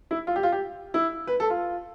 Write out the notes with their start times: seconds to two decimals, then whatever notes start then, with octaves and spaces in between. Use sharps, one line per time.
0.11 E4
0.27 F4
0.36 G4
0.43 F4
0.52 G4
0.94 E4
1.27 B4
1.40 A4
1.50 F4